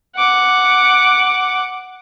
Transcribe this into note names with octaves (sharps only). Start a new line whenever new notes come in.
F#5 D6